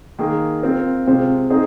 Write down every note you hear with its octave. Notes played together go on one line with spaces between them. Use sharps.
D#3 A#3 G#4
C4 F4 A#4
C3 G#3 F4 C5 F5
C4 D#4 G#4 D#5